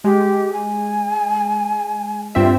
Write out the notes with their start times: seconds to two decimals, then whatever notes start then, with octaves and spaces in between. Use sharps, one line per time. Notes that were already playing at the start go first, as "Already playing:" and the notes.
0.04 G#3 G4
0.53 G#5
2.35 G2 C4 F4 E5